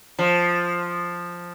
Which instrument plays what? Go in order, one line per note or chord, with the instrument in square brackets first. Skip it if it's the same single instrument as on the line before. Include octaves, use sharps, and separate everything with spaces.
[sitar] F3